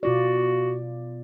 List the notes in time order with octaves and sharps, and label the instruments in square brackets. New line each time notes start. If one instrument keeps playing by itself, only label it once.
[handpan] B2 F4 D5 [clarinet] F#4